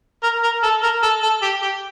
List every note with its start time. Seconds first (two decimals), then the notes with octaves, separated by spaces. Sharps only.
0.23 A#4
0.43 A#4
0.63 A4
0.83 A#4
1.03 A4
1.23 A4
1.42 G4
1.62 G4